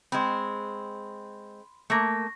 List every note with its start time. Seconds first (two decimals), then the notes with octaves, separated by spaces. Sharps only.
0.12 G#3 C4 B5 C6
1.90 A3 A#3 C#6 A#6